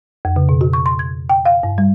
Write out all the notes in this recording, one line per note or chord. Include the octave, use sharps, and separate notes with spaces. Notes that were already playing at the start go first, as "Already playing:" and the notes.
F2
C#3
B2
F#4
C#6
C6
G#6
G5
F5
G2
G3